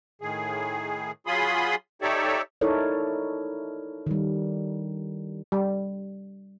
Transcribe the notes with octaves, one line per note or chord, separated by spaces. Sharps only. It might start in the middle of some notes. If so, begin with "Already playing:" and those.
A2 D#3 G#4
F#3 F4 G#4 B5 C6 D#6
D#4 G4 A4 C#5 D5 E5
D#4 E4 A4 A#4 C#5 D5
D#3 G3
G3